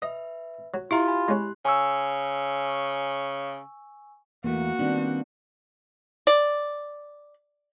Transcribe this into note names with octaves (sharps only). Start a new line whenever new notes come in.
B4 D#5 E5
F#3
E4 F4 G4 E5 A#5
G#5 B5
G#3 C#4 G4 C6 F#6
C#3 G#5 C#6 E6
E2 E3 A3 A#3 F#4
D#3 G3 B3 C4 D4
D5